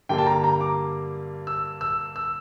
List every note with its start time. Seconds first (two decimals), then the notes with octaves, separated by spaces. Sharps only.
0.09 G2 D3 G3 A#3 G5
0.18 A5
0.27 A#5
0.44 A#5
0.61 D6
1.47 E6
1.81 E6
2.16 E6